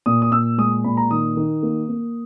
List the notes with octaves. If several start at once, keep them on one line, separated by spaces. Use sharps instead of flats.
A#2 D#6
D#6
A#2 E6
G#3 D#6
A#2 B5
A#5
D#3 D#6
D#3
A#3
A#3